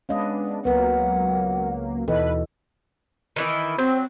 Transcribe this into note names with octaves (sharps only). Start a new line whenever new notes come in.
G#3 B3 C#4 D4 D#5 F5
C#2 F#3 A#3 B3 A#4 B4 F#5
D#2 B2 E3 A4 B4 D#5
D#3 E3 E4
F#3 C4 C5